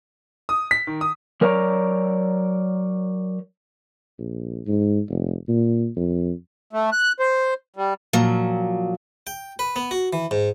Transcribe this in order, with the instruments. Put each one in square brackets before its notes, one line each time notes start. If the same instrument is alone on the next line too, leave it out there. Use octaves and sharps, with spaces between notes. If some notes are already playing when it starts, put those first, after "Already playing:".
[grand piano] D#6
B6
D#3
D#6
[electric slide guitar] F#3 A#4 C#5 D5 F#5 A#5
[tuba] A#1
G#2
F1
A#2
F2
[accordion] A3
F#6
C5
G3
[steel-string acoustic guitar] A#2 F3 F#3
[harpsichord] G5
B4
B3
F#4
E3
G#2